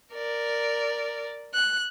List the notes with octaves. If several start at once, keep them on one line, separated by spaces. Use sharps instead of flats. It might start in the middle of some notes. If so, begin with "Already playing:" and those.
A#4 D5
F#6